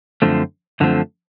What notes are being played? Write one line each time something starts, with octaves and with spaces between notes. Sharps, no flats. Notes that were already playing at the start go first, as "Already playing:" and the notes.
F#2 D3 F3 A3 C4
F#2 D3 F3 A3 C4